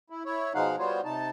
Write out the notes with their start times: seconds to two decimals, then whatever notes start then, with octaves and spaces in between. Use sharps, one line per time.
0.10 E4
0.25 E4 C#5
0.55 B2 F3 G#3 D#4 F5 F#5
0.79 G3 B3 F4 F#4 C5 C#5
1.05 C3 D#4 A5